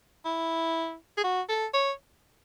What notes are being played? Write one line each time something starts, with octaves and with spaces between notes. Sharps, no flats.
E4
G#4
F#4
A4
C#5